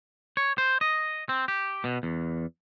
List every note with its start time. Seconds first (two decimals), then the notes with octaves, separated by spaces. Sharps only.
0.37 C#5
0.58 C5
0.81 D#5
1.29 C4
1.48 G4
1.84 B2
2.03 E2